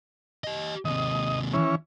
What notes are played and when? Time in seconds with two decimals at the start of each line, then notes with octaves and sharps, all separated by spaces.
0.44 G4 D#5
0.85 D#2 C3 D#5
1.53 E3 C#4